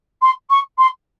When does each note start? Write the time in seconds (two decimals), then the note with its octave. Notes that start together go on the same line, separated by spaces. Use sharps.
0.22 C6
0.50 C#6
0.78 C6